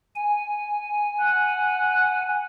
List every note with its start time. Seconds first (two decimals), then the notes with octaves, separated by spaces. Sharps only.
0.16 G#5
1.20 F#5